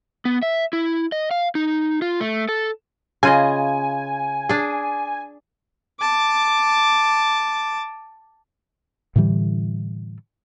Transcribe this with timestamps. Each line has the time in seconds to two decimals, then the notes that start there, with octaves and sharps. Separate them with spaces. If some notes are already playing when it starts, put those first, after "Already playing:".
0.25 B3
0.42 E5
0.73 E4
1.12 D#5
1.31 F5
1.55 D#4
2.02 F4
2.20 A3
2.49 A4
3.23 C#3 F4 D#5 G#5
4.49 D4 G#4
6.00 A5 D6
9.16 A2 D3 E3 G3